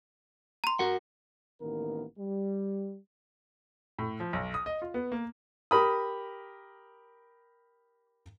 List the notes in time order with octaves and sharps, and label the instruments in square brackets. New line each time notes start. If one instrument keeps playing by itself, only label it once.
[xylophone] A#5 C6
[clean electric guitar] F#4 A#4 F#5
[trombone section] A1 D#3 A#3 B3 A#4
G3
[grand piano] A2
F3
B1
D#6
D#5
F4
B3
A#3
[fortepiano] G4 A#4 B5 D#6